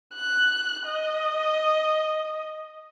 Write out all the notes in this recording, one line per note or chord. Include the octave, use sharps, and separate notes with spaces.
F#6
D#5